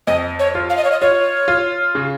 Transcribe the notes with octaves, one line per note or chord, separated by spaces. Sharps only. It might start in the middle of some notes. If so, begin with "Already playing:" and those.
F2 D#5
C#5
F4
F5
D#5
C#5
D#5
F4 C#5
F4
C#3